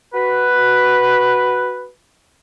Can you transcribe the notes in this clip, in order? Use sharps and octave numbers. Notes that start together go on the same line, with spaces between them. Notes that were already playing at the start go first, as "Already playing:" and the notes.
F#4 B4